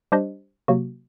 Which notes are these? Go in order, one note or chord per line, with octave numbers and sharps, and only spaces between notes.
G3 D4 G4 C5 D#5
C3 F#3 A#3 F#4